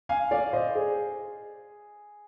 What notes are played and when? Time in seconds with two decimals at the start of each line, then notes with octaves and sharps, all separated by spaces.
0.09 F5 G#5
0.31 D5 F5
0.53 C5 D#5
0.75 G#4